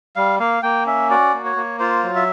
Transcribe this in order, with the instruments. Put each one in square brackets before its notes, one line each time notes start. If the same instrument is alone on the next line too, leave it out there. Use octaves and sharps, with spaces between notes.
[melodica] G3 F5
A#3 F5
A#3 G5
C#4 E5
F#4 D5
A#3
C#5
A#3
F4 C5
F#3
E5